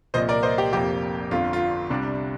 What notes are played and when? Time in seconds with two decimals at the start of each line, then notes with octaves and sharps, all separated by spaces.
0.14 C2 A#2 F3 A#3 C5 D#5
0.29 A#4 D5
0.43 C5 D#5
0.58 G4
0.73 F1 F2 C3 F3 A#3 G4
1.31 G1 F2 D3 F4
1.53 F4
1.90 C2 C3 G3 D4